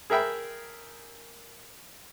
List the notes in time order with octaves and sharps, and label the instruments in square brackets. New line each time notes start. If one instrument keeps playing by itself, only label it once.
[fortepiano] G#4 A#4 E5 G5 B5